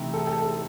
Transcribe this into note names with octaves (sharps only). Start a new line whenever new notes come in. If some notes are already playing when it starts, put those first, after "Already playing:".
Already playing: C3 E3 A3 C4 D#4
A4
A4
A4